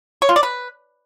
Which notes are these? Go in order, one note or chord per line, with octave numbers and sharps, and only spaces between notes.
C#5
F4
D5
B4